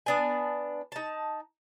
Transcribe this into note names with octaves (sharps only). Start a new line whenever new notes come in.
B3 D4 G#5
D#4 A5